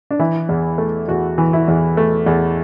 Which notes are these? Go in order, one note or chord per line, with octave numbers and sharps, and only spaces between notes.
D4
E3 E4
E2
A3
E2 F#4
E3
E4
E2
A3
E2